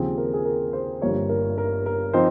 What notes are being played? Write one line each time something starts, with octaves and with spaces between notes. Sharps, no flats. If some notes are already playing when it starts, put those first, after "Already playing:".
Already playing: D#2 C#3 F3 C4 G#4
A#4
G#4
A#4
C5
G1 G2 F3 A#3 C#5
A#4
A#4
A#4
F3 C4 D#4 C5